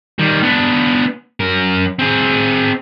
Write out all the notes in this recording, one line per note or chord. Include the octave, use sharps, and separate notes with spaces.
D#3 G3
B3 D4
F#2 A#4
C4 G#4